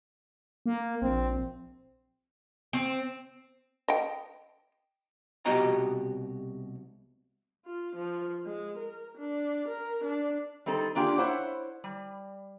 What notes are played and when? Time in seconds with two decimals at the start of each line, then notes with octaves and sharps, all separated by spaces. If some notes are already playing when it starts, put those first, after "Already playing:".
0.66 A#3
1.02 A#1 C4
2.73 C4
3.88 D#5 G5
5.46 C2 B2 F#4 G4 D#5 A#5
7.66 F4
7.96 F3
8.45 G#3
8.77 A#4
9.17 D4
9.68 A#4
10.04 D4
10.66 G3 C4 D#4 A4
10.95 A#3 D4 F4 G4 G#4
11.18 E4 C5 C#5 F#5
11.84 G3